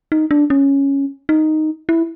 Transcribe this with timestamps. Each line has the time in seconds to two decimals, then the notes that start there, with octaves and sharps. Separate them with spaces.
0.12 D#4
0.31 D4
0.50 C#4
1.29 D#4
1.89 E4